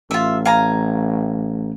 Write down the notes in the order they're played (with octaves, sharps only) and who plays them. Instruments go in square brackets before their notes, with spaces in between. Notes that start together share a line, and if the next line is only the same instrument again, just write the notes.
[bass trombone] A1 [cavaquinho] F4 E5
[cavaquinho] F5 G#5 A#5